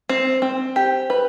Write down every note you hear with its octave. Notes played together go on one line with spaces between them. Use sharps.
C4
C4
G4
B4